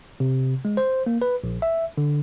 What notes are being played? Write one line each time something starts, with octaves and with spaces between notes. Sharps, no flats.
C3
G#3
C5
A#3
B4
A#1
E5
D3